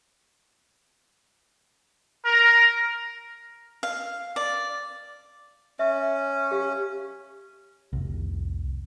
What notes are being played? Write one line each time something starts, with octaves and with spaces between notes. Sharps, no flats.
A#4
F5
D5
C#4 E5
G4 F5
F1 C2